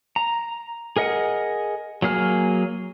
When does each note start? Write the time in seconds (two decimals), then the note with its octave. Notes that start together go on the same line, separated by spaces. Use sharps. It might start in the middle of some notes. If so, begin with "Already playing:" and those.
0.16 A#5
0.97 G#4 A#4 D#5 F#5
2.02 F#3 A#3 G#4 F6